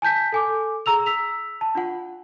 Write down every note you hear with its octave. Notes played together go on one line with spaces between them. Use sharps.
G#5 A5 G6 B6
A4 G#5 D6
G#4 A#5 E6 F7
E6 B6 F7
A5
D4 F4 F#5